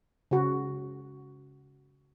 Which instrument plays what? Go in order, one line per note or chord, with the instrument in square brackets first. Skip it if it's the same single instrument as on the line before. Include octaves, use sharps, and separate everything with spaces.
[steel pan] C#3 F#4